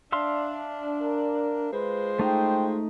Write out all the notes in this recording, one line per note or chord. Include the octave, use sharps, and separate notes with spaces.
D4 E5 F5 C6
A#4
G#3 F4 B4 C5
A3 D#4 G5